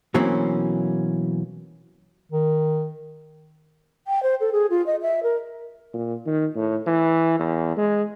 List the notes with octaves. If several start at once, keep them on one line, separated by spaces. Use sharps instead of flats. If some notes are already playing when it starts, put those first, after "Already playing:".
B2 E3 F#3 A#3 C4 C#4
D#3
G5
C5
A4
G#4
F4
D#5
E5
A#4
A#2
D#3
A2
E3
E2
G#3